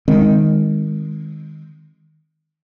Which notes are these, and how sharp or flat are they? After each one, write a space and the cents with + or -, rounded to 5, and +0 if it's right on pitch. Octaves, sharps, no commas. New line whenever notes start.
D#3 +0 G#3 -15 C4 +0